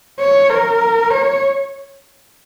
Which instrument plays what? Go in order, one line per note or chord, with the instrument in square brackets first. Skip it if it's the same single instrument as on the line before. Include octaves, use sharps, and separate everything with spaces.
[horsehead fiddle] C#5
A#4
C#5